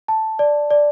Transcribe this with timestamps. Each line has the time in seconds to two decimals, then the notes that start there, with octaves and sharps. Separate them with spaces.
0.08 A5
0.39 D5
0.71 D5